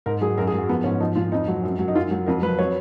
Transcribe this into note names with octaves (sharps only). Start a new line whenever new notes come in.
G#2 A#4
F#3 G#4
F#2 A#4
G#4
F#3 F#4
F3 B3
G#2 C#4
F3 D#4
A#2 F4
F2 D#4
F#3
F#2
F#3
D#4
F#2 F4
F#3
F2 A#4
F#3 B4
F#3 C#5